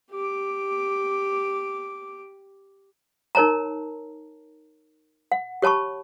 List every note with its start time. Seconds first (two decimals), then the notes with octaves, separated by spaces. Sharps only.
0.11 G4 D6
3.35 D#4 A#4 C#5 A5 A#5
5.32 F#5
5.62 G4 C#5 A5 B5 C#6